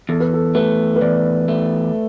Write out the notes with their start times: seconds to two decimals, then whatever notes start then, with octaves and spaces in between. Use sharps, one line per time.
0.09 E2 A4
0.20 B4
0.33 A4
0.55 A3 B4
0.96 B4
1.01 E2 D5
1.48 A3